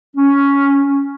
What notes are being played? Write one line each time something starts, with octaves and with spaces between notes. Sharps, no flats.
C#4